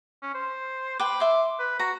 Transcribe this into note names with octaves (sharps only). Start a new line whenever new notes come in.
C#4
C5
B4 G5 D6
E5 C6
B4
F#4 A#5